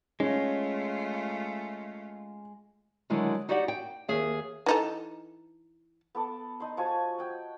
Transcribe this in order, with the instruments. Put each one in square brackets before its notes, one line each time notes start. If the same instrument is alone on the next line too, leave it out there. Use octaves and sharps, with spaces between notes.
[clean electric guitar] G#3 [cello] A3 F4 [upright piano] C#4
[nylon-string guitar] D3 D#3 F#3 G#3 E4
D#4 F#4 G4 D5 E5 F#5
G5
D#2 G#4 E5
[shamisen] E3 D#4 A4
[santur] B3 A4 D6
D#4 C6
F3 F#4 C#5 G#5
F#5 G5